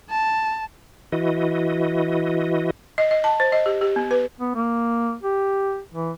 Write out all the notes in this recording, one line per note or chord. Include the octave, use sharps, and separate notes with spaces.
A5
E3 E4 F#4 D#5
D#5
D#5
A5
C5
D#5
G4
G4
B3
B4
B3
A#3
G4
E3